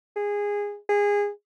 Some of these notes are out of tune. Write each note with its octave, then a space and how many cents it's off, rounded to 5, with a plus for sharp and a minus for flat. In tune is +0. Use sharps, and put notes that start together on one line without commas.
G#4 -15
G#4 -20